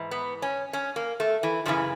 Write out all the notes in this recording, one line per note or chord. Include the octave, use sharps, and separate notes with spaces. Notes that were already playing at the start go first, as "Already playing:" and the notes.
Already playing: G#2 E3
B3
C#4
C#4
A#3
A3
E3
F#2 C#3 E3 F3